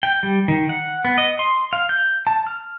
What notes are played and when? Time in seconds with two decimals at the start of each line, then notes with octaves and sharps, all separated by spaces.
0.03 G5
0.23 G3
0.48 D#3
0.69 F#5
1.05 B3
1.18 D#5
1.39 C6
1.73 F5
1.89 G6
2.27 A5
2.47 F6